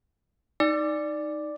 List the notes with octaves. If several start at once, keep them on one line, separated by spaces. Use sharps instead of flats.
D#4 D5